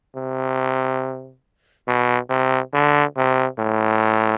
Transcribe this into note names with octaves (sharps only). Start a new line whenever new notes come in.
C3
B2
C3
D3
C3
A2